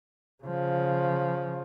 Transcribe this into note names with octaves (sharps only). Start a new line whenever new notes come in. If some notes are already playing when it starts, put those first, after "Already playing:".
C#3 F3